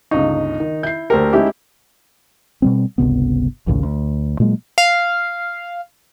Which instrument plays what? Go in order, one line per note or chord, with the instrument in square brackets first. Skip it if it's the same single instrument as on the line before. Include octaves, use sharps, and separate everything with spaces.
[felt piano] G1 C#2 C#6 [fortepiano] D#4
[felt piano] D#3
[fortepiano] E4 [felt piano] G6 C7
[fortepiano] D2 A#4 [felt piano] G4 C5
[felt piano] G#3 C#4 D#4 [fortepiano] E4 G4
[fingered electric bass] B2 G3 C4
G1 C#2 C3 B3
A#1 D#2 A2 C#3
D2
A#2 F#3 G#3 A#3
[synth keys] F5